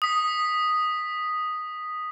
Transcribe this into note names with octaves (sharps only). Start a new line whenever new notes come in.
D#6 B6